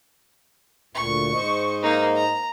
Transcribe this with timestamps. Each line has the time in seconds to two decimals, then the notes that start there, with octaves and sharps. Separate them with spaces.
0.95 D2 A#2 C#6
1.34 G#2 C5 D#5
1.83 A#3 D#4
2.16 A#5